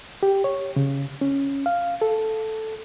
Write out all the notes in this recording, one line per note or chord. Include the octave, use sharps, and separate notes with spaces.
G4
C#5
C#3
C#4
F5
A4